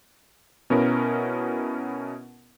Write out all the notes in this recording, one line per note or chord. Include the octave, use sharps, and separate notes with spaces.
B2 B3 C#4 E4 A#4